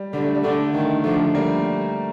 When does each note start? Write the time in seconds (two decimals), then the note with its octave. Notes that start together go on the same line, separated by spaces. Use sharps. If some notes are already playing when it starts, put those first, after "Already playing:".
Already playing: G3
0.13 D3 G3
0.24 A3
0.34 G3
0.43 D3 A3
0.74 D#3 A3
1.04 D3 F3 A3
1.35 G3 A#3